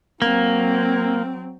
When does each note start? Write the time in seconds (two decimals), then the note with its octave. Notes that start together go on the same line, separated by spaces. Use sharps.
0.22 F#3 A#3 C4